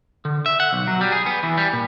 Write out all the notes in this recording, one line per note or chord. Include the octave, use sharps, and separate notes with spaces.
D3
E5
F#5
B1
F#3
G3
G#4
B3
E3
G3
A#2